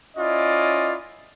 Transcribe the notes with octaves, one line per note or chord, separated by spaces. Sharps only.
C#4 E4 F4 D5 D#5